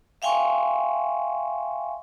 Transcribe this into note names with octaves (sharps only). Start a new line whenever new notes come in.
E5 F5 G5 G#5 C6 C#6